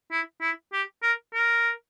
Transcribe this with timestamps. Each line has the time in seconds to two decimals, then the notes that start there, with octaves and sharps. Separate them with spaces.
0.12 E4
0.41 E4
0.73 G4
1.03 A#4
1.34 A#4